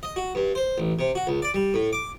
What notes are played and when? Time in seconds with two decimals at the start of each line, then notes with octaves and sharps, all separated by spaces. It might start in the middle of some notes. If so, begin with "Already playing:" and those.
0.03 D#5
0.16 F#4
0.35 G2
0.55 C5
0.78 A1
0.99 C3
1.15 F#4
1.27 C#2
1.42 D5
1.54 G3
1.74 A2
1.93 D6